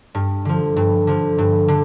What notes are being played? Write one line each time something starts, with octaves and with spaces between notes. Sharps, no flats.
G2
D3 F3
G2
D3 F3
G2
D3